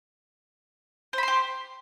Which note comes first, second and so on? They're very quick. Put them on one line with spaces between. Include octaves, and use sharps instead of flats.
C5 B5 C6 G4